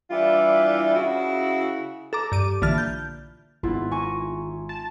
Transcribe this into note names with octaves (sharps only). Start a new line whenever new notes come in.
E3 G3 D4 E4 F4
C#3 E4 F#4
A4 A#5 D6
G2 D6 D#7
A#1 D3 E3 F6 A6
G6
G#1 B3 E4 F4
G#5 A#5 C#6
A5